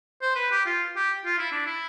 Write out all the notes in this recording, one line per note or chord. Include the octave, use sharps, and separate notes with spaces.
C5
B4
G4
F4
G4
F4
E4
D4
E4